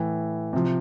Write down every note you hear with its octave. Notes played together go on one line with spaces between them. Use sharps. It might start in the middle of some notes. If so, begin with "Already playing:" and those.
Already playing: A2 E3
C3 F3